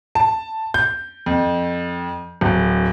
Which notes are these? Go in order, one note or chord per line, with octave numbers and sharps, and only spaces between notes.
A5
G6
F2
D1